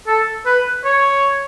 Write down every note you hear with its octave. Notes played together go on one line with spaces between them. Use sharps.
A4
B4
C#5